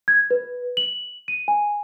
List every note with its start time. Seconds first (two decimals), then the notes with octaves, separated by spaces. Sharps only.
0.08 G#6
0.31 B4
0.77 F#7
1.28 D#7
1.48 G#5